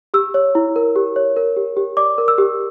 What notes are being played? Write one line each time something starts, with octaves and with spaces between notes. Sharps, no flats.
G4 E6
C#5
E4
A#4
G4
C#5
A#4
G4
G4
D5 D6
A#4
E6
G4